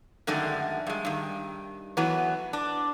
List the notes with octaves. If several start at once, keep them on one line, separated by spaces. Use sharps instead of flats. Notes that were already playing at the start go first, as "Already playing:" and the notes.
F#2 D3 D#3 G#3 A3
G2 G#3
G2 D#3
E3 F#3 A3 B3
D4